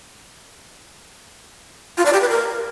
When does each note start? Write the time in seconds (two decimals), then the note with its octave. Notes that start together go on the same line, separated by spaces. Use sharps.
1.98 F4
2.05 D5
2.13 G4
2.21 B4
2.29 A#4